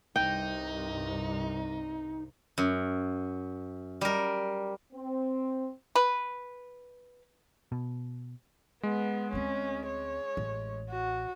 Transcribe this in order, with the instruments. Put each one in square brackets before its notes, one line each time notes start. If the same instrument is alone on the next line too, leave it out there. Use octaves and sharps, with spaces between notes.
[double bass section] C2 G2 C3 [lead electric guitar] D#4 [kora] G5
[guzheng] F#2
G3 A#4
[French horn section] C4
[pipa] B4
[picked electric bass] B2
[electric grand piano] G#3 [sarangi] B3
[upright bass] D2 C4 [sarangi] C#4
[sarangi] C#5
[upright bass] A1
[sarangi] F#4